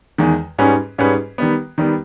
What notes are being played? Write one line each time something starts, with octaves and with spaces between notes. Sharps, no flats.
E2 D#3 G#3
G#2 G3 C#4 G#4 B4
G#2 G3 C#4 G#4 B4
D#3 G3 B3
D#3 G3 B3